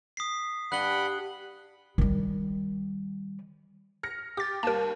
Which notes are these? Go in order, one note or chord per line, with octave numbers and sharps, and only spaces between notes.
D#6 B6 C7
G2 F#5 B5 F#6 G7
D#3 G3
F6 A#6 C#7
G4 D6 A6
D#2 G3 A#4 A5